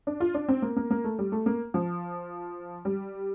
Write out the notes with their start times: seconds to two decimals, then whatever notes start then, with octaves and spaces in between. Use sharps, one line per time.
0.07 D4
0.20 F4
0.34 D4
0.48 C4
0.62 A#3
0.77 A#3
0.90 A#3
1.04 A3
1.19 G3
1.32 A3
1.46 A#3
1.74 F3
2.85 G3